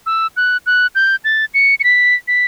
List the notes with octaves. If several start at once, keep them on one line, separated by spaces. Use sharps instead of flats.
E6
F#6
F#6
G6
A6
C#7
C#7
B6
B6